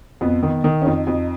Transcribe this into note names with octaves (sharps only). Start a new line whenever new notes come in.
F2 B3
D#3
D#3
C#4
F2 D#4
F2